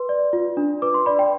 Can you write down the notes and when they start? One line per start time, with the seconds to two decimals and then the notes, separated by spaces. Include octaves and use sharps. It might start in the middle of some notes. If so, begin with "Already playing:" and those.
Already playing: B4 C6
0.09 D5
0.33 F4
0.57 D4
0.82 B4 D6
0.94 C6
1.06 D5 B5
1.19 G5